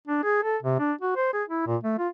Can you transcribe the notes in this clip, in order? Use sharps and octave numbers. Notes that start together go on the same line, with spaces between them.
D4
G#4
A4
C3
D4
F#4
C5
G#4
E4
A#2
A3
F4